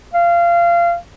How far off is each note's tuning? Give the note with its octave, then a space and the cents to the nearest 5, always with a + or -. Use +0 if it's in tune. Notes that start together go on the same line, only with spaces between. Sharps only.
F5 -25